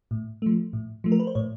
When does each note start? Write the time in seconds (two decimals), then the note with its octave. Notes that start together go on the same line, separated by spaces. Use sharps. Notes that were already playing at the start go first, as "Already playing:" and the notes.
0.11 A2
0.42 F3 A3
0.73 A2
1.04 F3 A3
1.12 A#4
1.20 B4
1.27 C5
1.35 A2 C#5